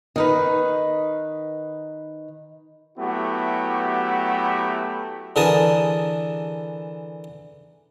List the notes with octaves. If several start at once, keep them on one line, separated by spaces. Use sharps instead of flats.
D#3 D#4 B4
F#3 A3 B3 E4 F#4 G4
D3 E3 G#4 A#4 A5 D#6